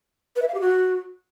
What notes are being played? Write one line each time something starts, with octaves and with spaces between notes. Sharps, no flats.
B4
E5
F5
G4
F#4